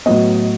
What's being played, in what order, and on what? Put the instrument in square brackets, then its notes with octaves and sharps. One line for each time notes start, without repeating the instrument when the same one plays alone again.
[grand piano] A2 F#3 B3 D#5